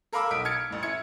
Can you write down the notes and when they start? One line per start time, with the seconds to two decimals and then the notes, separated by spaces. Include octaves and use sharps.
0.13 A4 A#4 F5 B5 D6 E6
0.31 B1 D#6 B6 D7
0.45 F6 G#6 A6 C#7
0.70 A1 A2
0.83 E4 G#6 C#7